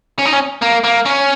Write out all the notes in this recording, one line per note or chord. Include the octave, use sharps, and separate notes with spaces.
C#4
D#4
C#4
A#3
A#3
C#4